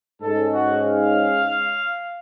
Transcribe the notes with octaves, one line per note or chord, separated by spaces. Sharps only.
G#2 G#3 C#4 A4
F#4
F5